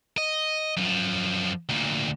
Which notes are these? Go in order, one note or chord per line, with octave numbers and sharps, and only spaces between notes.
D#5
F#2 F3
D2 A#2